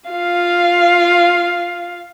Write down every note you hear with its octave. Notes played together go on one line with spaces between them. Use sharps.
F4 F5